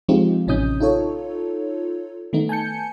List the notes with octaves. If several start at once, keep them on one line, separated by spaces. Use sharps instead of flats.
F3 G#3 C4 D#4 F4 G4
A1 C3 C#4 D#4 D#6 G6
D#4 F4 A4 C#5
D#3 A3 B3 D#4
G#5 A5 G6 C#7